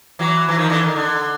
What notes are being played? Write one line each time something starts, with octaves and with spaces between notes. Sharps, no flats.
E3 F#3
E3
D#3 F3
D3 E3
D#3
D3